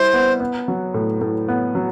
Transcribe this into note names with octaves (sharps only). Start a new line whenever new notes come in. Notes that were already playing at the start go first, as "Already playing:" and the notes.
Already playing: G3 E4 C5
B3
B3
F#3
A2
A2
B3
F#3